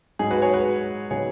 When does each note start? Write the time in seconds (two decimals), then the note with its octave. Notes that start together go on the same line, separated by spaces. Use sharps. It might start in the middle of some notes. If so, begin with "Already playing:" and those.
0.19 G#2 F#3 D#4 G#4
0.31 F#4 B4
0.42 G#4 C#5
0.54 F#4 B4
1.11 C#3 F#3 B3 D#4 G#4 C#5